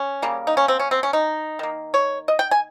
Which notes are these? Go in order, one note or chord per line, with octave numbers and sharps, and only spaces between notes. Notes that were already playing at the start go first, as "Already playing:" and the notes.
Already playing: C#4
C#3 G3 A#3
D#4
C#4
C4
C#4
C4
C#4
D#4
D#3 A#3
C#5
D#5
G5
G#5